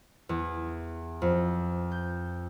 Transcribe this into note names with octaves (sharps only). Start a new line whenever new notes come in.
E2
F2
G6